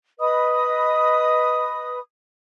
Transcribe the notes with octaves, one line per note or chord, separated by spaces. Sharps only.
B4 D#5 B5 D#6